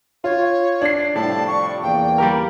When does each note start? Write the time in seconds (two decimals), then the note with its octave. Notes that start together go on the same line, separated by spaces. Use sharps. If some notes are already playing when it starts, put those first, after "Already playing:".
0.24 F4 C#5
0.82 D4 C7
1.15 A2 C3 F3 G3 A5
1.47 C#6
1.83 E2 A#3 G5
2.18 G3 G4 A#4